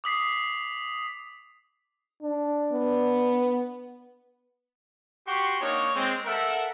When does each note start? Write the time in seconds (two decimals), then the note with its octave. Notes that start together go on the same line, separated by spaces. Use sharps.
0.04 D6 D#6 B6 C7
2.22 D4
2.72 B3
5.26 F#4 G4 C6 C#6
5.60 A#3 D4 D#4 C#5
5.93 G#3 C4
6.25 A4 A#4 E5 F#5